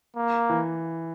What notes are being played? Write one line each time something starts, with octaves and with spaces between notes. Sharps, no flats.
A#3
E3